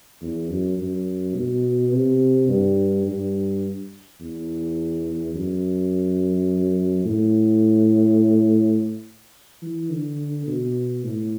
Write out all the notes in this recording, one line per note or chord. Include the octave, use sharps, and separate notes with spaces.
E2
F#2
F#2
B2
C3
G2
G2
E2
F#2
A2
E3
D3
B2
A2